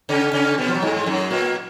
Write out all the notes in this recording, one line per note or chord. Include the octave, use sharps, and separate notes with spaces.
C#3 C#4
C#3 C#4
B2 B3
F3
F#3
G#2 G#3
G#3
F#2 F#3
A#2 A#3